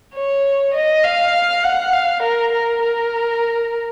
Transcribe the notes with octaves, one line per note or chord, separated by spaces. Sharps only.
C#5
D#5
F5
F#5
F5
A#4
A#4
A#4